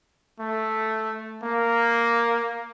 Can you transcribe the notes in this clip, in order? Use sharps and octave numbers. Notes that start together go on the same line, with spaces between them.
A3
A#3